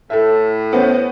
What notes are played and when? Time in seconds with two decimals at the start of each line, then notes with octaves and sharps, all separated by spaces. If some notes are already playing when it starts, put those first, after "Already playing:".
0.10 A2 A4 E5
0.73 B3 C#4 C5